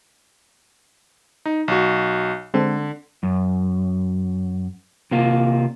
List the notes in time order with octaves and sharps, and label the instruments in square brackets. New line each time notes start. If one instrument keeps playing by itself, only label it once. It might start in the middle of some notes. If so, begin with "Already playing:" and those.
[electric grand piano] D#4
B1 F#4
[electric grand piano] D3 [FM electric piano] G#3 C4 A4
[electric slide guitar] F#2
C3 A#3 F4